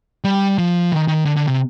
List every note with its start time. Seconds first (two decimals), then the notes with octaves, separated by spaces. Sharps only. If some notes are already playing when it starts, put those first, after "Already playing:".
0.24 G3
0.58 F3
0.92 D#3
1.08 D#3
1.25 D3
1.36 D3
1.48 C3